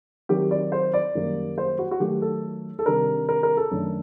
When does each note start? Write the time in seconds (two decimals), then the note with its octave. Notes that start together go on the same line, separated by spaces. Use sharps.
0.29 D#3 F#3 C4 G4
0.51 D5
0.72 C5
0.94 D5
1.15 F#2 D#3 G3 A#3
1.58 C5
1.79 F#4
1.91 F#4
2.00 D#3 F#3 A3 G4
2.22 A4
2.79 A4
2.85 C3 D#3 G3 D4 A#4
3.29 A#4
3.43 A#4
3.57 A4
3.71 F#2 D#3 A3 D4